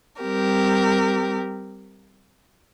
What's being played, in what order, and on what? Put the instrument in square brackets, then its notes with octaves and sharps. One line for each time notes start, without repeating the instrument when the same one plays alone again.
[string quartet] G3 C4 G4 A#4